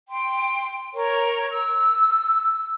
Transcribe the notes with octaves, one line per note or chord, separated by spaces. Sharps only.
G5 C6
A#4 C#5 C#6
E6